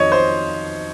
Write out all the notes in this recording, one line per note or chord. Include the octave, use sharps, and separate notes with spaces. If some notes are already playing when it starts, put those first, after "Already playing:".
Already playing: F2 D#3 F#3 C#5 D#5
C5